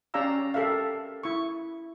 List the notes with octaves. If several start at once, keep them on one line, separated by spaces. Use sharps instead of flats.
C#4 G4 D5 F5 A#5 E6
G4 A4 A#4 E5 F5
E4 C#6